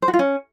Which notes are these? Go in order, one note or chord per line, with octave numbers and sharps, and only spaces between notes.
C5
F#4
F4
C#4